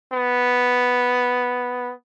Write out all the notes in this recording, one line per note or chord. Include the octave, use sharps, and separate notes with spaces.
B3